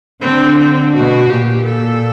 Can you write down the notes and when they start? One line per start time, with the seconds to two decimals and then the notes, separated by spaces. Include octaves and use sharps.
0.21 D3 C4
0.58 C4
0.94 B2 F#4
1.29 A#2 G4
1.65 A4